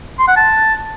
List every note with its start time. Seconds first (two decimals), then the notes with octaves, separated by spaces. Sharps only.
0.19 C6
0.28 F#5
0.36 A5